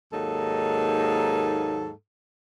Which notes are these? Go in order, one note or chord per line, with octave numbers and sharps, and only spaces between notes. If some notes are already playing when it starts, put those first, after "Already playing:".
D#2 G#2 F#3 A#3 D#4 A4